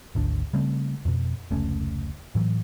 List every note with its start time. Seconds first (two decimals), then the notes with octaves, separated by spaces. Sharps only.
0.15 G#1 D2 D4
0.53 C#3 G3 A3 C4
1.05 F2 B2
1.51 F1 C#2 A3 C#4
2.35 A2 E3 F#3